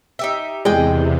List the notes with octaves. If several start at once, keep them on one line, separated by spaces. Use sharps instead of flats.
D#4 G4 E5
E2 C3 G#3 D5 D#5 G5